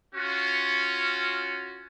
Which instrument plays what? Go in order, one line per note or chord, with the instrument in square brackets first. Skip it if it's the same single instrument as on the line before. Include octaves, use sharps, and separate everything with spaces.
[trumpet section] C#4 F4 F#4